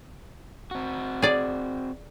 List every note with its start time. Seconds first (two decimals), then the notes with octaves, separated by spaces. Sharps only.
0.71 C4 F#4
1.22 G#4 D5